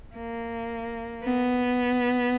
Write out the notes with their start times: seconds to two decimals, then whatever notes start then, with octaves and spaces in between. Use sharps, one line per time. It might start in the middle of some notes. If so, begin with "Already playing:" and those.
0.15 A#3
1.25 B3